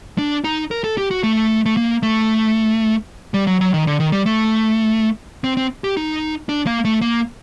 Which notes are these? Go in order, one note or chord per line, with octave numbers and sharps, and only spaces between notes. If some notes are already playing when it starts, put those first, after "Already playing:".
D4
D#4
A#4
A4
G4
F#4
A3
A3
A#3
A3
G3
F#3
F#3
D#3
D3
D#3
G3
A3
C4
C4
G4
D#4
D4
A#3
A3
A#3